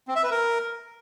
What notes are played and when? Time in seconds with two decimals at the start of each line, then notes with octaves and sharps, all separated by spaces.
0.08 C4
0.16 E5
0.23 B4
0.31 A#4